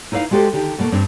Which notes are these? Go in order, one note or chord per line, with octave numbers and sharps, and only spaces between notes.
D#4 E4 B4 C#5 F5
G#3 F#4 G4 A4 C5
D3 D#3 G4
B2 A3 A#3
G2 C4 D4